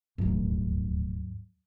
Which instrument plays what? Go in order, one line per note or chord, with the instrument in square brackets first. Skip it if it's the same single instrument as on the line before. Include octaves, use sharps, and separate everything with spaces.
[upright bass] D1 A#1 [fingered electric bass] D#2 G#2 F#3